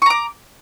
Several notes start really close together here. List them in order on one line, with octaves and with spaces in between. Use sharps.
C#6 A#5 D6